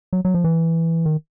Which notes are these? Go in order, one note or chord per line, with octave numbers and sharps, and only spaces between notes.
F#3
F#3
F3
E3
D#3